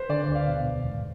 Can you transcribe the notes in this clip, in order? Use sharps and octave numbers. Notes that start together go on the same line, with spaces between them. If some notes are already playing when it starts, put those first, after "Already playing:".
Already playing: B4 C5
D3 D5
D2
F5
B2
E2
G#2